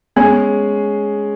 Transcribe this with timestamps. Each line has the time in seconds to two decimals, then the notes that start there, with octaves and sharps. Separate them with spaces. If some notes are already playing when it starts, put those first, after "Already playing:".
0.16 G#3 B3 C#4 G#4